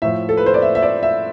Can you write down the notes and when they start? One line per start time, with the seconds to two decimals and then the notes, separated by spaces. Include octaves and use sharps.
0.02 A2 F3 E5
0.29 A4
0.37 B4
0.46 C5
0.54 D5
0.62 E5
0.75 E5
0.83 D5
1.03 E5